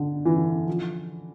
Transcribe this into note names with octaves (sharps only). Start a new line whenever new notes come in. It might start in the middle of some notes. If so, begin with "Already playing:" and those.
Already playing: D3
E3
F3